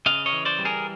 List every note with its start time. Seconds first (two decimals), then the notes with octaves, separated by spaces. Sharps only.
0.06 C#3 D#5 F5
0.26 C#5 D#5
0.33 E3
0.45 C5 D5
0.59 G3
0.65 G#4 A#4